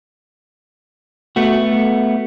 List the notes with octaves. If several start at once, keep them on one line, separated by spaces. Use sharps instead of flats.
A3 B3 F#4